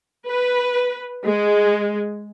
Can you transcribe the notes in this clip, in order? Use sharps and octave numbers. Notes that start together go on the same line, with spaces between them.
B4
G#3